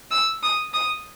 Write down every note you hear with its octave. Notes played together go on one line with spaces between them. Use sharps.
E6
D#6
D#6